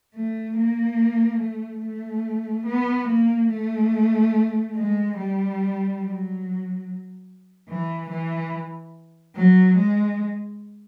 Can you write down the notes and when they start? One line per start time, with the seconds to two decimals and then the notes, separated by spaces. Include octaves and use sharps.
0.15 A3
0.57 A#3
1.40 A3
1.83 A3
2.67 B3
3.08 A#3
3.49 A3
4.75 G#3
5.17 G3
6.00 F#3
7.69 E3
8.10 E3
9.35 F#3
9.77 G#3